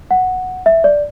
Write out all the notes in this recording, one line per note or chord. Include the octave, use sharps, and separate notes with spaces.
F#5
E5
D5